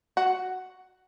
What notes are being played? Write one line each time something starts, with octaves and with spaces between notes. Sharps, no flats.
F#4